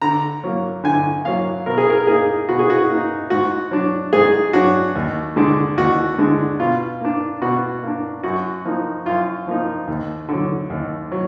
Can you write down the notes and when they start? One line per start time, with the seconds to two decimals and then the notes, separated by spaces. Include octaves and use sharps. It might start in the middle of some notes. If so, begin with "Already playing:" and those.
0.02 D3 A#5
0.44 F#3 A#3
0.84 D3 G#5
1.25 F#3 A#3 F5
1.66 B2 A#4
1.78 G#4
1.89 A#4
2.07 A#3 D#4 G#4
2.49 B2 F#4
2.59 G#4
2.70 F#4
2.89 A#3 D#4
3.30 G#2 F#4
3.71 F#3 D4
4.13 G#2 G#4
4.53 F#3 D4 F#4
4.95 D#2
5.36 D3 G#3 D4
5.77 D#2 F#4
6.18 D3 G#3 D4
6.60 B2 F4
7.00 A#3 D4
7.41 B2 F#4
7.82 A#3
7.87 D4
8.23 F#2 F#4
8.65 F3 A#3 D#4
9.05 F#2 F4
9.47 F3 A#3 D#4
9.88 D#2
10.29 D3 F#3
10.70 D#2
11.12 F#3